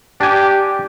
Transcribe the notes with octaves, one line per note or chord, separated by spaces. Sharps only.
D4 G4 G#5